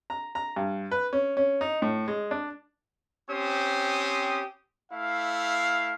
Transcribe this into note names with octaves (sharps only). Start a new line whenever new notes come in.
A#5
A#5
G2
B4
C#4
C#4
D#4
A2
G#3
D4
C4 C#4 G4 C5 D#6
A3 E4 F5